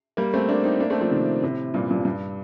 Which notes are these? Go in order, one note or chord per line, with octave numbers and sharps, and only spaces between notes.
G3 A#3
A3 C4
A#3 D4
C4 D#4
A#3 D4
A3 C4
F3 A3
C3 D#3
A2 C3
G2 A#2
G2 A#2
G2